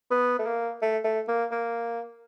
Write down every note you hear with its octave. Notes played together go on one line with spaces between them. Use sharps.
B3
A3
A#3
A3
A3
A#3
A#3